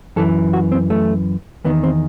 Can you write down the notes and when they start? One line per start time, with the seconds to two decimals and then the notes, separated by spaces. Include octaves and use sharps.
0.16 F#2 E3 A4
0.53 F#4
0.72 C4
0.90 A3
1.65 E2 D#3 B3
1.84 C4